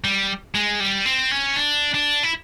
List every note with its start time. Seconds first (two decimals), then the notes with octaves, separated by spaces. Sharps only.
0.04 G3
0.55 G#3
0.80 G3
1.06 C4
1.31 C#4
1.56 D4
1.94 D4
2.23 E4